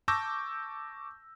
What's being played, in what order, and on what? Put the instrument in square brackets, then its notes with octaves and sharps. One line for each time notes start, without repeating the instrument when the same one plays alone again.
[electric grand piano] A5 C#6 D6 E6 G6 A#6